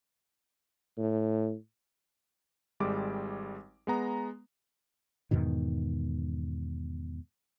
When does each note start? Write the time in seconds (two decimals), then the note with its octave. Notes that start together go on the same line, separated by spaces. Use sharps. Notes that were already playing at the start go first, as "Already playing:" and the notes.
0.97 A2
2.80 G#1 G3 G#3 D6
3.87 G#3 B3 A#5
5.31 E2 G#2 B2 D#3